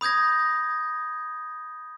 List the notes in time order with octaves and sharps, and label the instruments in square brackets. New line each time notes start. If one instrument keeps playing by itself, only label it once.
[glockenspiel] B5 D#6 G6 G#6 A#6